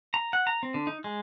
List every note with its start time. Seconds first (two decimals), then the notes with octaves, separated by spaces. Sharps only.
0.14 A#5
0.33 F#5
0.47 A#5
0.63 C4
0.74 D3
0.87 D#4
1.04 G#3